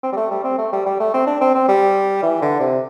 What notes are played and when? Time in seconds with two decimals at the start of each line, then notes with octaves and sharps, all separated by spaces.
0.03 C4
0.13 G3
0.16 A3
0.31 G3
0.44 C4
0.58 A3
0.72 G3
0.86 G3
1.00 A3
1.14 C4
1.27 D4
1.41 C4
1.55 C4
1.68 G3
2.23 E3
2.42 D3
2.60 C3